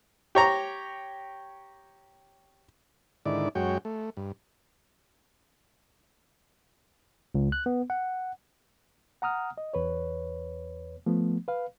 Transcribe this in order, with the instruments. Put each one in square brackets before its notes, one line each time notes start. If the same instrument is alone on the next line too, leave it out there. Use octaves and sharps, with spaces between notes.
[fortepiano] G4 C#5 A#5
[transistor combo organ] G#2 D3 D#3 E4 D5
F#2 G#3 F#4 C#5 G5
A3
G2
[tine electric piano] C#2
F#6
B3
F#5
[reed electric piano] F#5 A#5 D#6 F6
D#5
E2 B4 C#5
F3 A3 B3
B4 F5